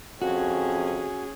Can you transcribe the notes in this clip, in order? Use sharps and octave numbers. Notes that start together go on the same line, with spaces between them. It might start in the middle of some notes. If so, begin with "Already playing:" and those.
F2 C#4 F#4 G#4